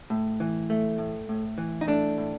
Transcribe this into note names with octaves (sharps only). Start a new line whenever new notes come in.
A2
E3
A3
A2
A2
E3
D#4
A3 D4
A2